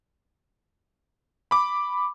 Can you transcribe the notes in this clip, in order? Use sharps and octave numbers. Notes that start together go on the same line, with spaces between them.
B5 D6